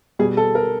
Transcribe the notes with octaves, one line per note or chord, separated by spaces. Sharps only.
B2 G3 G#4
A4
A#4